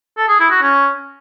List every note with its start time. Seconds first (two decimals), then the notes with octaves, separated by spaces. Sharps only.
0.17 A4
0.28 G#4
0.40 E4
0.51 F#4
0.62 C#4